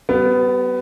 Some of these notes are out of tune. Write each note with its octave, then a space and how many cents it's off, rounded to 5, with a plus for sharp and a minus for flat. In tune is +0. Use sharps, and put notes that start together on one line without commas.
G3 -35 B3 +15